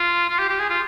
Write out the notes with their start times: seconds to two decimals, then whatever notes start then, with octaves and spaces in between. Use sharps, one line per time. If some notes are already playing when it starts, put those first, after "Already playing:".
Already playing: F4
0.29 F4
0.39 G4
0.49 G4
0.59 G#4
0.70 F4